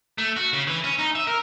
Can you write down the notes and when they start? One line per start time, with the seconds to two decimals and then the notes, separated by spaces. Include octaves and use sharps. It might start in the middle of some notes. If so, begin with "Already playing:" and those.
0.18 A3
0.37 F#4
0.53 C#3
0.67 E3
0.84 C#4
0.99 D#4
1.15 E5
1.27 A#4